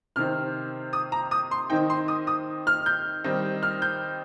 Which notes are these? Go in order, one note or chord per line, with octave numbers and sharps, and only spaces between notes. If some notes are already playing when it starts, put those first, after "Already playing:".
C3 D#3 C4 F6
D#6
A#5
D#6
C6
D#3 C4 D#4 G5
C6
D#6
D#6
F6
G6
D#3 G3 C4 D#4
F6
G6